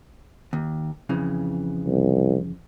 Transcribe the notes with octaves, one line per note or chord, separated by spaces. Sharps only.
D#2
F2 C#3 E3
C2